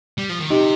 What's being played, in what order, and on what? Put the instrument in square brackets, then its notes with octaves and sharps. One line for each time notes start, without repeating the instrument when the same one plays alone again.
[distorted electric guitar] G3
F3
D#3
[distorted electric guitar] C3 [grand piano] D#4 G4